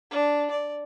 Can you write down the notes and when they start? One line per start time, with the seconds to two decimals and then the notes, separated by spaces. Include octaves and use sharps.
0.11 D4
0.51 D5